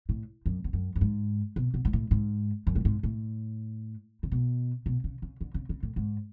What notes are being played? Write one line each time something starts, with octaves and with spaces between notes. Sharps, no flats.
A2
F#2
E2
F#2
F#2
G#2
B2
B2
G#2
A2
G#2
F#2
A2
G#2
A2
C#3
B2
B2
C#3
C#3
D3
C#3
C#3
A2
G#2